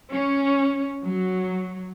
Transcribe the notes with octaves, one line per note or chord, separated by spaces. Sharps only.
C#4
F#3